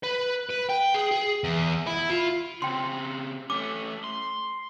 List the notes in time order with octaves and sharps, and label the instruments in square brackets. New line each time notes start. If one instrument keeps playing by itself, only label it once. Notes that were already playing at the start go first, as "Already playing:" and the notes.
[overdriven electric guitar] B4
B4
G5
G#4
G#4
E2
E4
F4
[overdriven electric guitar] C#3 C4 [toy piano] G5 C6
[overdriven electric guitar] A3 C#4 [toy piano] D6
[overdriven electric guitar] C6